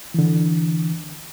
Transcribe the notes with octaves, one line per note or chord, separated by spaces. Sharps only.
D3 E3